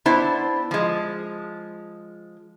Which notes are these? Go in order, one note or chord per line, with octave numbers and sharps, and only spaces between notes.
B3 D4 E4 C5
F3 G#3